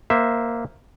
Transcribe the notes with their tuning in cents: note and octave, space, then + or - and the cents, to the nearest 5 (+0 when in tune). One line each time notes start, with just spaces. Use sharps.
A#3 +0 C5 -10 E5 +0